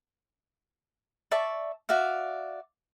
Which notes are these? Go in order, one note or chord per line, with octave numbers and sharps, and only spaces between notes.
D5 E5 A5 C#6
F#4 D5 E5 F5